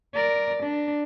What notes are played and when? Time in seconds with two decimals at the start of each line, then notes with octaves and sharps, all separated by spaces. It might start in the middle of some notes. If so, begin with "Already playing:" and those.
0.14 A#4 D5
0.63 D4